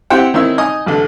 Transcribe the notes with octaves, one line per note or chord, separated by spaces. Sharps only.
C4 E4 G4 C5 F#5 G5
D#3 C4 C#4 D#4 E4 E6
D#4 D#5 G#5 D#6
A1 D3